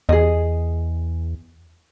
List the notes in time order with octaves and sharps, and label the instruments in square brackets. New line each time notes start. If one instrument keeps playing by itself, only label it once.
[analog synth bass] E2 [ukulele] G#4 D#5